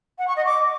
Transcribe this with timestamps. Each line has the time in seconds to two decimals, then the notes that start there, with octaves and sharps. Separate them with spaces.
0.18 F#5
0.27 C#6
0.36 D#5
0.45 D6